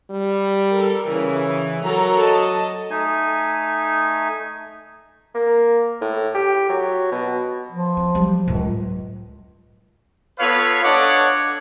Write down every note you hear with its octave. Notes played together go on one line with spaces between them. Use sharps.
G3
A4 A#4
C#3 E3
F#3 A4 A#4 A#5
D#5 A5
A3 D#4 G#5
A#3
A2
G4
F#3
B2
F3
C4
F#3 G3
C#2 F#2 A2
B3 F4 A4 B4 C#5 F5
D4 A4 C#5 D#5 F#5 D6